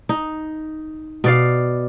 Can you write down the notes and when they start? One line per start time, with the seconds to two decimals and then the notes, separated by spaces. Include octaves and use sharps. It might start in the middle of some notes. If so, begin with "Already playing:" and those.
0.09 D#4
1.24 B2 D5 F5